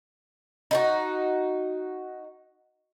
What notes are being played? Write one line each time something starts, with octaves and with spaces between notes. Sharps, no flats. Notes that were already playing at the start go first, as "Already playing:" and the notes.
D#4 E4 F#4